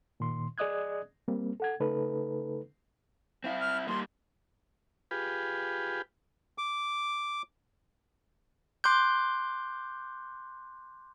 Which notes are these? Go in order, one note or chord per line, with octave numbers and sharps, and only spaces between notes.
A#2 D#3 C6
G#4 D5 D#5 D#6 F#6 G#6
G3 A#3 C4
A4 F#5 G#6
C#3 A3 D#4 A4 B4
C4 E4 F5
F6
G3 A#3 C6
F4 G4 G#4 B4
D6
C6 D6 F#6 G6